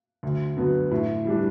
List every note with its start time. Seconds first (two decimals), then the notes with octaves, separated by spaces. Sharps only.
0.23 D2
0.57 D3 F#3 B3
0.91 A2
1.25 E3 G3 D4